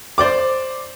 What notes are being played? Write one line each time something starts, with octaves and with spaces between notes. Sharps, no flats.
C5 D5 D6